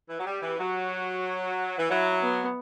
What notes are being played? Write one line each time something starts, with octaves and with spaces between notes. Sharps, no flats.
E3
F#3
G3 G4
E3
F#3 F#4
E3
F#3 E4
B3